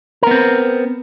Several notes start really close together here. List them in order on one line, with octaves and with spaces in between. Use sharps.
A#4 B3 C4